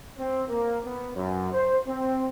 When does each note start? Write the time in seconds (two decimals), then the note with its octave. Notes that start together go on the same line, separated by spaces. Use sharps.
0.18 C4
0.48 A#3
0.84 B3
1.15 F#2
1.52 C5
1.87 C4